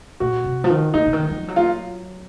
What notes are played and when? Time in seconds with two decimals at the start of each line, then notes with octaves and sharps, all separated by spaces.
0.20 A#2 F#4
0.44 C3
0.64 F3
0.70 D#3
0.94 D#3 D#4
1.06 C#3
1.13 D#3
1.30 F3
1.48 F#3
1.56 F4